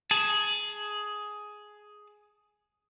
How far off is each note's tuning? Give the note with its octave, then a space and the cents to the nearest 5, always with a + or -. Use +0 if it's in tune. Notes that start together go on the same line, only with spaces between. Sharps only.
G#4 +10 A5 -10